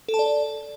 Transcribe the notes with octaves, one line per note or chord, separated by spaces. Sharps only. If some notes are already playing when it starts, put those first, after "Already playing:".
A4
A5
D5